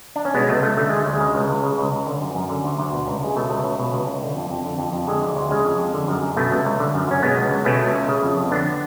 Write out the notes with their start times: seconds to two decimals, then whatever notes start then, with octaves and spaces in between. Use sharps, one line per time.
0.16 D4
0.25 C#4
0.34 B2 G#3 B3
0.49 C#2 A3
0.63 C#2 A3
0.77 D3 A3
0.89 D2 G#3
1.06 D2
1.13 G#3
1.20 C#3
1.35 C#2
1.50 C#2
1.63 C#3
1.78 C#2
1.92 C#2
2.07 D3
2.21 F#2
2.35 F#2
2.49 D3
2.64 D2
2.78 D2
2.93 B2
3.07 C#2
3.21 C#2 G#3
3.36 B2 A3
3.50 C#2
3.64 C#2
3.79 B2
3.93 C#2
4.07 C#2
4.22 D3
4.36 F2
4.50 F2
4.65 D3
4.79 F2
4.93 F2
5.07 D3 G#3
5.22 D2
5.36 D2
5.50 C#3 G#3
5.65 F2
5.79 F2
5.94 D3
6.08 F#2
6.22 F#2
6.37 B2 A3
6.51 C#2
6.65 C#2
6.80 D3
6.94 F#2
7.08 F#2 C#4
7.23 B2 G#3 B3
7.37 C#2
7.51 C#2
7.65 B2 A3 C#4
7.80 C#2
7.95 C#2
8.09 C#3
8.23 F2
8.37 F2
8.51 D3 B3 D4